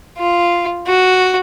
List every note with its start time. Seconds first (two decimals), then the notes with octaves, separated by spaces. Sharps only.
0.18 F4
0.87 F#4